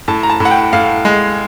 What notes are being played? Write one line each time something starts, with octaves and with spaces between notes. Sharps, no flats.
A2 A5
A#5
A5
A2
F#5
G5
A2 F5
G#3